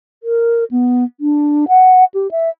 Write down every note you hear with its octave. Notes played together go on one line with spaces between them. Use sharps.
A#4
B3
D4
F#5
G4
E5